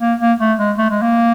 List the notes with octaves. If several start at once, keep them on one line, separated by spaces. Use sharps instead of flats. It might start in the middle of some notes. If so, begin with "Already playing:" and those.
A#3
A#3
A3
G#3
A3
G#3
A#3